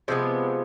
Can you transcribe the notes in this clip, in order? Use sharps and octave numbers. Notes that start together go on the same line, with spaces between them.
C3 F3 G#3 B3